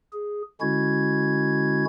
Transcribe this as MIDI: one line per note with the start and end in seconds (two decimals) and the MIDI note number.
0.13 0.42 68
0.61 1.85 50
0.61 1.85 56
0.61 1.85 61
0.61 1.85 64
0.61 1.85 66
0.61 1.85 92